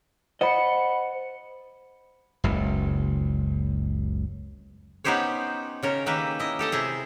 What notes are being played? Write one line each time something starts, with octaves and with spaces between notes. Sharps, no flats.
C5 D#5 F#5 B5 C#7
F#1 C#2
B3 C#4 D#4 G4 C5 C#5
C#3 C#4 A#4
D#3 A#3 G4 B4 E5
E4 D#5
G4 A4 D#5
C3 E4 G#4